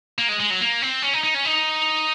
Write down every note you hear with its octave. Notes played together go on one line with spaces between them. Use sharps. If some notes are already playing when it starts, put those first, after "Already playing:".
A#3
G#3
G#3
F#3
A#3
C4
C#4
D#4
D#4
C#4
D#4